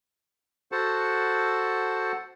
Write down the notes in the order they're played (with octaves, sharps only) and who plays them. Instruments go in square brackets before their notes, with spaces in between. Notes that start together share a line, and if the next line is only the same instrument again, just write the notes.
[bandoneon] F#4 A4 C5 F#5 A5